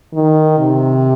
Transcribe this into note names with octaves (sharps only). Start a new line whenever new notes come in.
D#3
C3